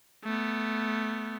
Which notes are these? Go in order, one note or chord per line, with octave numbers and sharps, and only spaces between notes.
A3 B3